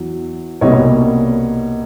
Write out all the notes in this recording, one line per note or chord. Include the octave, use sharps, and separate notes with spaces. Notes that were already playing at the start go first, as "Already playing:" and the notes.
Already playing: E2 F#3
C2 B2 G3 A#3 C#5 D#5